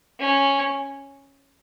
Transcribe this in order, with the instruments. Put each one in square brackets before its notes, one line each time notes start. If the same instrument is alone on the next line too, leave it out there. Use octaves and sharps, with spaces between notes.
[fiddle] C#4